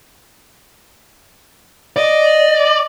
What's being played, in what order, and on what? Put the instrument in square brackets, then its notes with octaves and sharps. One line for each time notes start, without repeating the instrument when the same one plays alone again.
[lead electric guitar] D5 [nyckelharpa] D#5